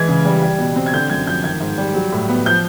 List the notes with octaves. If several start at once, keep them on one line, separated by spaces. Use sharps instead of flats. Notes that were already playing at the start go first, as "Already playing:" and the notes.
Already playing: E3 G#3 G#6
C#3
G3
G3
B2
C4
G#6
D3 G6
F#2 G#6
F3 G6
D#3 G#6
G#2
G3
F#3
A2
B3
F3 G6